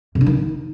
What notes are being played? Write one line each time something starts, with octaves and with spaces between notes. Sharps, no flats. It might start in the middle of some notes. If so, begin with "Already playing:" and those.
C3
D4
D#3